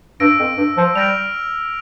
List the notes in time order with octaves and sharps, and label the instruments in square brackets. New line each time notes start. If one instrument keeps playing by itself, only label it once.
[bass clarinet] G2 [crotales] E6 A#6 D7
[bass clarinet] F2
G2
F3
[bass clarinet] G3 [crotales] F6 A#6 D7 F7